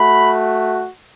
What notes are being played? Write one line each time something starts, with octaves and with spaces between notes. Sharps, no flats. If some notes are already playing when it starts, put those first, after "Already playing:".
Already playing: A3 F#4 B5